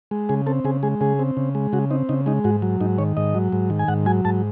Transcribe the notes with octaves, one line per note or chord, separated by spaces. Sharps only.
G#3
C#3 G#4
C4 A4
C#3 G#4
G#3 G#4
C#3 G#4
C4
C#3
G#3
C#3 F#4
C4 D#4
C#3 D#4
G#3 D#4
G#2 F#4
F#3
G#2 D#4
D#3 C#5
G#2 D#5
F#3
G#2
D#3
G#5
G#2 F#5
F#3 G#5
G#2 A5